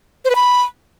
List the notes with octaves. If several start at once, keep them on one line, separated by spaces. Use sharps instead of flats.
C5
B4
B5